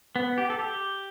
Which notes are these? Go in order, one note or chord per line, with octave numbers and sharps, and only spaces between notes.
B3
G4
A4
G4